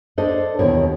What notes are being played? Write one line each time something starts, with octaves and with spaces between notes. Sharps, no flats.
D4 A4 C5 D#5
D#2 B2 E3 A#4 C#5